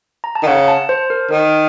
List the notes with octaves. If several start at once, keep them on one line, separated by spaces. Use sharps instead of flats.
A#5
A5
D#3
C#3 F#5
A5
C5
A#4
D#3 A#4